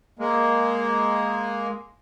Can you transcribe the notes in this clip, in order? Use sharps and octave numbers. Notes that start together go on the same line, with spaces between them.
G#3 A#3